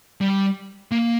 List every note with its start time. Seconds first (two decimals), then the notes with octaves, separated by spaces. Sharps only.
0.21 G3
0.92 A#3